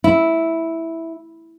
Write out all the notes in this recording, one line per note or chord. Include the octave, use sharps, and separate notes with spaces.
E4